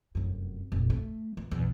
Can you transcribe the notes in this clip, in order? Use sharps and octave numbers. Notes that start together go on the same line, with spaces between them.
F1 F#2
F1 A#2
A3
E3
B1 E2